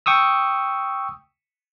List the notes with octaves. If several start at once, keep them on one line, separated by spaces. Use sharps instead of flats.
G5 C#6 D#6 E6